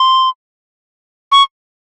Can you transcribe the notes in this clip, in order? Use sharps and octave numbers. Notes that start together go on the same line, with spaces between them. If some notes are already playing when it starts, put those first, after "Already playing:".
Already playing: C6
C#6